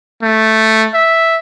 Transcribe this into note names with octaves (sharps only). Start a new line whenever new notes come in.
A3
E5